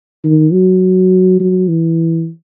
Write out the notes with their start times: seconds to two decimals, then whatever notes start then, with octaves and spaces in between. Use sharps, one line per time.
0.24 D#3
0.53 F#3
1.40 F#3
1.68 E3